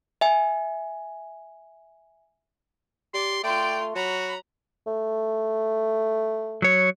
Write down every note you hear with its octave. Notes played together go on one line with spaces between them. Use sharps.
E5 G#5
G4 D5 C6
A3 F4 D5 G5 C6
F#3 F#4 A#5 B5
A3
F#3 C#5